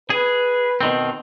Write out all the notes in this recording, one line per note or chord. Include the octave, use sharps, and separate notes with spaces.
G#4 B4
B2 D#3 C4